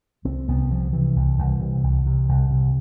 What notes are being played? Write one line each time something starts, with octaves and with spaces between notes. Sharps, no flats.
C2 C4
C2 B3
C3 F3
C3 E3
C2
C2
C3
C2
C3
C2
C3